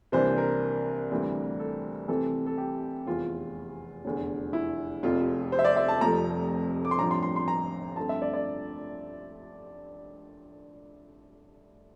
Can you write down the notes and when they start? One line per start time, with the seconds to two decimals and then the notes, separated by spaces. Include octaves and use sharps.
0.12 C2 C3 E3 A#3 D4 C5
0.38 A#4
1.10 D2 C3 E3 G3 C4
1.59 A4
2.08 C2 C3 E3 A3 C4 A4
2.46 A4
2.58 G4
3.07 F1 E2 E3 F4
4.05 F1 E2 D3
4.53 E4
5.03 F1 F2 C3 F4
5.52 C5
5.59 E5
5.65 D5
5.76 E5
5.88 A5
6.01 F1 F2 C3 F3 A3 A#5
6.85 D6
6.91 C6
6.99 A1 G2 F3 C4 A#5
7.11 C6
7.23 C6
7.36 C6
7.48 A#5
7.96 G2 D3 A3 C4 A5
8.09 E5
8.22 D5
8.34 D5